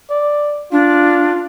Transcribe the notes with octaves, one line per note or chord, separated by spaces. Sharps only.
D5
D4 F4